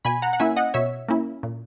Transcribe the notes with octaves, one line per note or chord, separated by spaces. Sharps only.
B2 G#5 B5
F#5 A#5
F#5
A#3 C#4 E4 E5 G#5
D#5 F#5
B2 C#5 E5
A#3 C#4 E4
A#2